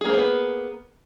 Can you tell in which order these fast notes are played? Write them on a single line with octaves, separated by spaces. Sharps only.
G#4 A#3 C5 B3 B4